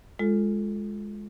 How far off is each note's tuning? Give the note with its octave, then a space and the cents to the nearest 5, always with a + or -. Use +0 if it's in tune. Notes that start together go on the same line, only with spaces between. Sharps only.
G#3 +0 F4 +5 A4 +0